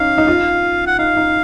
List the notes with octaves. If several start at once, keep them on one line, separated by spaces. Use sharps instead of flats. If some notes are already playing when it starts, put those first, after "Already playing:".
Already playing: C#4 D#4 F5
D#4
F4
F#5
D#4 F5
D#4